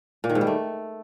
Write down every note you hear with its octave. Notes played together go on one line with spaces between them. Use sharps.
A#2
D#3
G#2
G3
A3